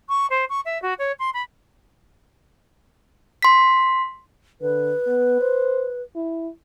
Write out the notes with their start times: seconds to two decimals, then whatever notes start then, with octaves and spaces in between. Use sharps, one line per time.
0.08 C#6
0.30 C5
0.49 C#6
0.65 E5
0.82 F#4
0.98 C#5
1.19 C6
1.33 B5
3.42 C6 B6
4.61 D3 B4
5.07 B3
5.41 C5
6.16 E4